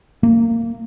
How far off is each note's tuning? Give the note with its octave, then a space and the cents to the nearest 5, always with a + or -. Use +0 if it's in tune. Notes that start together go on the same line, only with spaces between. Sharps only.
A#3 -20